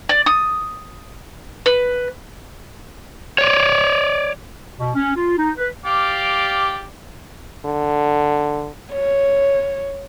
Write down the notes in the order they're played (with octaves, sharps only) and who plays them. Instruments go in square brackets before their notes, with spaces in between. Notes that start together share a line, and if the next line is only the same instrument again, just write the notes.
[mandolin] D5
D#6
B4
[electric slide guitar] C#5 D5
[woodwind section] B2
C#4
F4
D#4
B4
[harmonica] G4 D5 F5
[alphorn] D3
[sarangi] C#5